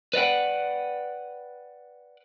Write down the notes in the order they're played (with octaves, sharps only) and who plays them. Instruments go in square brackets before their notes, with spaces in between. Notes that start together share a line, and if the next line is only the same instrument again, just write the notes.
[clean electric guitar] B4 D5 D#5 F#5 G5